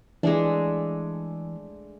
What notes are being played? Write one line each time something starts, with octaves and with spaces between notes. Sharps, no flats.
E3 G#3 A3 D4